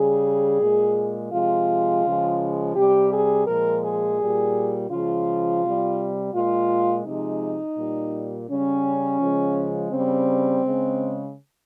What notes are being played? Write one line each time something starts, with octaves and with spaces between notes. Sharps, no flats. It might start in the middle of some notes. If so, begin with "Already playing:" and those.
Already playing: C#3 G3 G#4
A#2 G#3
C3 F3 G#3 F4
C#3 F3 G#3
C3 G3 G4
G#4
A#2 F3 G#3 A#4
G#4
A#2 G3
C#3 F3 G#3 F4
C3 G3
A#2 G#3 F4
C3 F3 G#3 D#4
A#2 G3
C#3 G3 C#4
C#3 F3 G#3
C#3 G3 C4
C#3 G#3